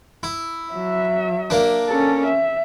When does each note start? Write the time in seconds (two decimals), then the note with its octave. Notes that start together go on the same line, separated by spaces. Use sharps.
0.23 E4
0.72 F#3 E5
1.50 A#3 D4
1.89 C#4 A4
2.26 E5